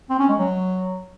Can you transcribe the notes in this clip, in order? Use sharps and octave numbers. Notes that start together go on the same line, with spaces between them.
C4
C#4
G#3
F#3